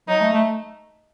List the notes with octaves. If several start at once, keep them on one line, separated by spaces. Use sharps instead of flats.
F#3 D#4
A3
A3